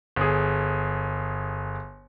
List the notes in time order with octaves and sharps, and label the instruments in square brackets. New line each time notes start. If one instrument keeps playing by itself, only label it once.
[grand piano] G1 G#4